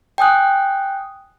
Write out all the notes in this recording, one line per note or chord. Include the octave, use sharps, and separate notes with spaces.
G5 G#5 D#6 F#6